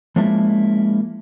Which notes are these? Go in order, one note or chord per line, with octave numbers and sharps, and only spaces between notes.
F3 G#3 A#3 C#4 E4 A5